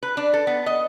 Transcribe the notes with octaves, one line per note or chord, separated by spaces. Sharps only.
B4
D4
A4
B3
D#5